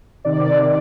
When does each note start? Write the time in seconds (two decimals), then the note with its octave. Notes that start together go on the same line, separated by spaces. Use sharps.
0.25 C3 D#3 D5